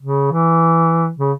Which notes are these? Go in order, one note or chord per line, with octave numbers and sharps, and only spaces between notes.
C#3
E3
C#3